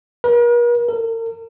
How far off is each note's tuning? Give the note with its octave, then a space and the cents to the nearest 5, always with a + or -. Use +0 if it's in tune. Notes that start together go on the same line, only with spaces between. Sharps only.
A#4 +45
A#4 -40